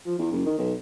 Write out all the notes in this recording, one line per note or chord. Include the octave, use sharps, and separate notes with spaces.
F3
E2
F#1
D#3
B1